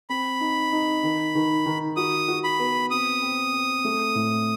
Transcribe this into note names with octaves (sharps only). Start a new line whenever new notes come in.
C4 B5
D#4
D#4
D#3
D#3
D#3
F#4 D#6
F#4
B5
B3
C4 D#6
C4
C4
A3
A2